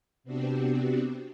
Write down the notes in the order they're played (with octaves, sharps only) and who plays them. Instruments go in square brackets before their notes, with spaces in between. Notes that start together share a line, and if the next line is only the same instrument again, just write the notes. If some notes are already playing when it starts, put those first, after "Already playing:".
[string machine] C3 B3 C4 D4 F#4 G4